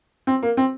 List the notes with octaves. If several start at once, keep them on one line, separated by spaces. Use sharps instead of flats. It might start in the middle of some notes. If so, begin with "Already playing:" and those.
C4
A#3
C4